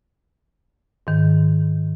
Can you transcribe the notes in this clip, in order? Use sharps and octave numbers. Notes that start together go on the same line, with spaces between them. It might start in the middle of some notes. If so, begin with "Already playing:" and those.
G#2 D#3